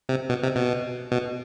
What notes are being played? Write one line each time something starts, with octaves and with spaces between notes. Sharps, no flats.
C3
B2
C3
B2
B2